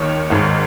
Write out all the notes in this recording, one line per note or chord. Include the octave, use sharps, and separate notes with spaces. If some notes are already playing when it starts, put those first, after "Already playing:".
Already playing: D#2 D#3 C#5
G#1 G#2 D#3